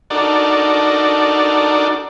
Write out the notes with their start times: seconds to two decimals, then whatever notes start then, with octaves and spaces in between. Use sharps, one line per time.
0.10 D4 D#4 F#4 A4 A#4 D5